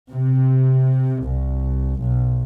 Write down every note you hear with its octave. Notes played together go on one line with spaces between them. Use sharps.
C3
C2
B1